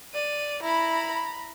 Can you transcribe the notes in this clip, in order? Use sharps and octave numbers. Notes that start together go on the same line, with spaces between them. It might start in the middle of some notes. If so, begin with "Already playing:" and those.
D5 D#7
E4 A#5 B5